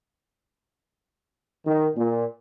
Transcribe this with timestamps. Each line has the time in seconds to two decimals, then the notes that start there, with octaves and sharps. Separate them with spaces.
1.67 D#3
1.97 A#2